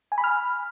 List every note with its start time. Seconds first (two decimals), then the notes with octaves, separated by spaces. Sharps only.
0.12 G#5
0.18 B5
0.24 F6